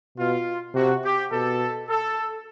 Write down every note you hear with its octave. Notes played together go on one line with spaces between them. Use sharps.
B2 F4
C3 F#4
G4
B2 A4
A4